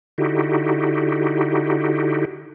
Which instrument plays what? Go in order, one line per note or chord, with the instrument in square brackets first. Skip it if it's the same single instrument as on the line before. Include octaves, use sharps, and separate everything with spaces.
[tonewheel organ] D3 D#4 E4 F#4 G4